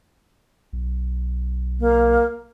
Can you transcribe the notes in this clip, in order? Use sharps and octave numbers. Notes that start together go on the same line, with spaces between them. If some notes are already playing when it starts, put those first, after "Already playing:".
B1
A#3